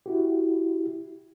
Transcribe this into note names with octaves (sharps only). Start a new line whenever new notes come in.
E4 F#4 G4